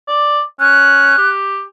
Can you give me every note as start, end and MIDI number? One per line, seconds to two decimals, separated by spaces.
0.08 0.42 74
0.60 1.17 61
0.60 1.29 90
1.18 1.63 67